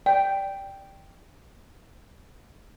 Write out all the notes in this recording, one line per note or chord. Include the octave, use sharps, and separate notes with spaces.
D5 G5